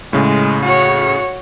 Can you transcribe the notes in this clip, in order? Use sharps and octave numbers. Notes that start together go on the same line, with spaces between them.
A2 C#3 G#3
F#4 C#5